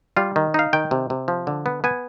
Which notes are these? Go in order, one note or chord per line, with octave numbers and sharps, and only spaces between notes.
G3 F4
D#3
D#4 F5
D#3 G5
C3
C3
F3
D3
B3
B3 G#5